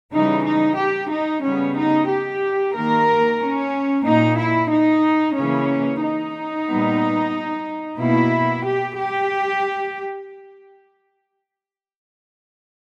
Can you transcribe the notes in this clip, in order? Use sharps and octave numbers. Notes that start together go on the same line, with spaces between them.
C#3 E3 G3 D#4
D#4
G4
D#4
C#3 G3 B3 C#4
D#4
G4
D#3 A#3 A#4
C#4
A#2 A#3 D#4
E4
D#4
C#3 E3 A#3 C#4
D#4
A#2 G3 B3
B2 A#3 E4
G4
G4